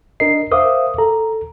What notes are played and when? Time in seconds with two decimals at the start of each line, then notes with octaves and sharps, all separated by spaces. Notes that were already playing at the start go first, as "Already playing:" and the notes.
0.20 D4 A#4 D#5 C7
0.51 A#4 C5 E5 F5 D6 D#6
0.98 A4 A#5